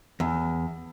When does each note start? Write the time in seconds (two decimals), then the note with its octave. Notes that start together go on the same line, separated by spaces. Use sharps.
0.20 E2